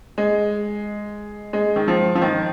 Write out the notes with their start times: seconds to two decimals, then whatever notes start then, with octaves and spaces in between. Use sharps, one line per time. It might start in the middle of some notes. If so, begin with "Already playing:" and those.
0.18 G#3
1.53 G#3
1.76 D#3
1.88 F3
2.15 F3
2.22 D#3